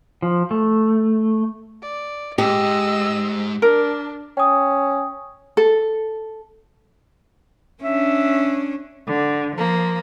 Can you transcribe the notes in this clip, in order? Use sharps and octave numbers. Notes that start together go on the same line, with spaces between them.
F3
A3
D5
G#2 G4 D#5 E6
D4 A#4
C#4 G5 D#6
A4
C#4 D4 E5
D3
F3 A#3